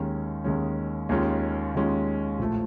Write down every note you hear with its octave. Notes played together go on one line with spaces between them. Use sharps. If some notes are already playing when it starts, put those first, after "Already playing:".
Already playing: D#2 D#3 G#3 C#4
D#2 D#3 G#3 C#4
D#2 D#3 G#3 C#4 F4
D#2 D#3 G#3 C#4 F4
A#1 A2 F3 A3